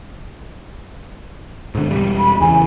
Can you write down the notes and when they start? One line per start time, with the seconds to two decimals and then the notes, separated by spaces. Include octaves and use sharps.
1.75 G#2 D3
1.91 E1 G3
2.19 B5
2.41 E2 C#3 E3 G#5